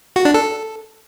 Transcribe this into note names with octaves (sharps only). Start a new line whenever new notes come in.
F#4
D4
A4